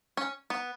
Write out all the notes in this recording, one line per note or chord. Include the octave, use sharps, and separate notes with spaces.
C#4
B3